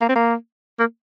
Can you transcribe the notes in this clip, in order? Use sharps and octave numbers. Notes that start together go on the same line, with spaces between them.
A#3
C4
A#3
A#3